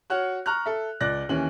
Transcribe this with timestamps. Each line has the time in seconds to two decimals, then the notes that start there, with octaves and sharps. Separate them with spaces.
0.10 F#4 C#5 F#5 F6
0.46 A#5 C#6 F6 F#6
0.66 A4 E5
1.01 C#2 D5 F#6 A#6
1.29 D#2 E3 C#4 F#7